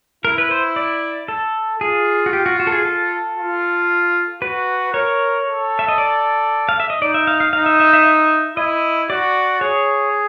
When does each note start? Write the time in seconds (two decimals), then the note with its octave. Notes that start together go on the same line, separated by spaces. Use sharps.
0.25 E4 A#4
0.38 B4
0.51 C5
0.76 D5
1.28 A4
1.81 F4 G#4
2.26 F#4
2.33 G4
2.46 F#4
2.60 F#4
2.67 A4
2.72 G#4
2.85 A4
3.37 F4
4.42 F#4 B4
4.93 A#4 C#5
5.45 A4
5.79 E5
5.88 D#5
5.98 D5
6.69 F5
6.80 E5
6.90 D#5
7.01 D#4 D5
7.14 E5
7.27 F5
7.40 F5
7.53 D#4 F5
7.66 E5
7.80 E5
7.93 E5
8.06 E5
8.57 E4 D#5
9.10 F#4 D5
9.61 G#4 C#5